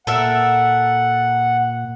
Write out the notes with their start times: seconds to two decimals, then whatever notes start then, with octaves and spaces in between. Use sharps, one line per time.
0.07 A#2 A4 A#4 E5 F#5